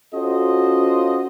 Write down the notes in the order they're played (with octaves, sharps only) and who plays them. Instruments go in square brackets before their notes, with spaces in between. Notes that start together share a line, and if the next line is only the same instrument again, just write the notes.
[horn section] C#4 F4 F#4 A4 C5 D#5